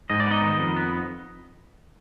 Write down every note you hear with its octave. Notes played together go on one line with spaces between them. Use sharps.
G#2 D#5
D5
B3 D#4 D#5
D#3
F2
B3